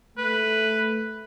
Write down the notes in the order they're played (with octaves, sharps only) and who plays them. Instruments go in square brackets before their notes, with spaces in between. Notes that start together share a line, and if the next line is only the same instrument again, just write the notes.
[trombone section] A3 [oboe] B4